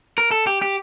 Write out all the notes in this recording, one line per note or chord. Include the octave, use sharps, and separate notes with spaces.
A#4
A4
G4
G4